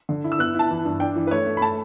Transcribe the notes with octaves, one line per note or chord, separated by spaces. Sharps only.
D3
E4
E6
B3 F#6
E4 A5
E3
G2
D4 G5
E3
B4
A3 C#5
A3
B5
A3 A5